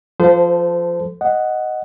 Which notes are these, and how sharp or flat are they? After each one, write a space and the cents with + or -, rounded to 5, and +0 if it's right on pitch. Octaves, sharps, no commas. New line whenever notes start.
F3 +0 A4 +0 C5 -25
D#5 +0 F#5 +0